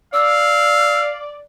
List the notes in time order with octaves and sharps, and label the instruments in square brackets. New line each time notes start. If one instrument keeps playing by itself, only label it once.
[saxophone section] D5 [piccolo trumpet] F5 [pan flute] E6